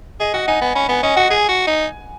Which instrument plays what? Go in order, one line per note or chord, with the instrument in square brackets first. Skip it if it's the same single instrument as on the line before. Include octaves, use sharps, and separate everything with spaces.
[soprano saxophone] G#4 [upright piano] D#5
[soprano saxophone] F#4 [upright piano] F#5
[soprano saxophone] D#4 [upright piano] G#5
[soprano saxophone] B3 [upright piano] G#5
[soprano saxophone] C#4 [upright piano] B5
[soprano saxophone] B3 [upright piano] G#5
[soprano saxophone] C#4 [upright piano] D#5
[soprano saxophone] F#4 [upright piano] F#5
[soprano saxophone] G#4 [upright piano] G#5
[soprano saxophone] F#4
D#4